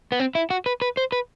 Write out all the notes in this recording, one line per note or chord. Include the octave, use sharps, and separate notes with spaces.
B3
C4
E4
F#4
B4
B4
C5
B4